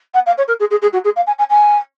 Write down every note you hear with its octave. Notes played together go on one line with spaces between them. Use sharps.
F#5
F5
C#5
A#4
G#4
G#4
G#4
F#4
G#4
F5
G#5
G#5
G#5